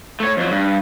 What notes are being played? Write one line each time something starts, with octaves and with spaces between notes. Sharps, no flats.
A3 C#5
F2 F#3
G2